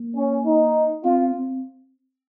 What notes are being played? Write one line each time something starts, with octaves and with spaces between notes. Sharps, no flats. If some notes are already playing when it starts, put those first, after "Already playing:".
Already playing: A#3
C#4
D#4
C4 F4
C4